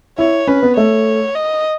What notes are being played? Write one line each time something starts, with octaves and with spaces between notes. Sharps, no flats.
E4 C#5
C#4 B4
B3
A3 C#5
D#5